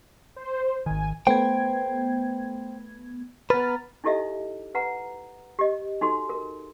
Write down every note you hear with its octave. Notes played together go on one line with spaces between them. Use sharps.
C5
G#1 D#3 G#5
A3 B3 C5 G5 G#6
B3 B4 A#5 F6 A6
D#4 E4 G4 A4 D#5 E5
B4 F#5 A#5
G4 D#5
D#4 F#4 A4 C6
A#4